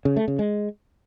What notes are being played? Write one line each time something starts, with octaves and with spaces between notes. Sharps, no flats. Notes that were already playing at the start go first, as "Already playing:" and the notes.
C#3
A3
C#3
G#3